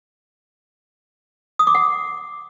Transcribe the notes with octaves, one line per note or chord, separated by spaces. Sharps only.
D#6
D6
F#5